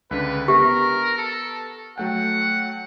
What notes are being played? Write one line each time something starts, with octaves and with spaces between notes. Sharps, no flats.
C#2 D3 B4
B3 G4 A#4
A4
F#3 A3 F#5 G5